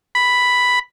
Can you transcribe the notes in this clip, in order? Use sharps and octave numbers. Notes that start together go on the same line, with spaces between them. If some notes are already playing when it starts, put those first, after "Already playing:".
B5